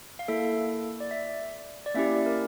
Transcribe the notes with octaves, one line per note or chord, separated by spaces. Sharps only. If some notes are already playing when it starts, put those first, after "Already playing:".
F5
A#3 E4 A4 E5
D5
E5
D5
A#3 C#4 E4 G4 E5
D5
D5
A#4